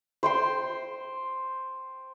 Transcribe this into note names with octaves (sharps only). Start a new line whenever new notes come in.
C5 G5 C6